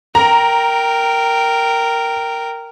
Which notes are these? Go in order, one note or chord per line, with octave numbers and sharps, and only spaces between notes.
A#4 G5 A#5